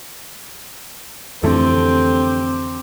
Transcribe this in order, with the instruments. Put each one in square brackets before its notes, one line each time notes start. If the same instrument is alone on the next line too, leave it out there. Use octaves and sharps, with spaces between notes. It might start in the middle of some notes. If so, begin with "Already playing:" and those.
[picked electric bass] F2 E3 A3 [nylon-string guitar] D3 A4 [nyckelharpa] C4 G4